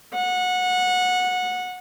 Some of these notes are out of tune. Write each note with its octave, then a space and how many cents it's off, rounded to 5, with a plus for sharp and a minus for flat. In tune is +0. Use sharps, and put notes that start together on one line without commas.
F#5 -20